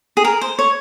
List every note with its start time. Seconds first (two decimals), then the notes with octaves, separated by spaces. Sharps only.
0.17 G#4
0.25 A#4
0.42 C5
0.59 C#5